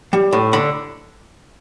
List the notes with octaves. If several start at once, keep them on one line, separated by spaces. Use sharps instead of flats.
G3
A2
D3 B5